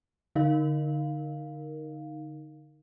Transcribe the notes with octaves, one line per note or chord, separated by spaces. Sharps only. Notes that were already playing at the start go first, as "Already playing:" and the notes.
D3 D#4 A#4 F5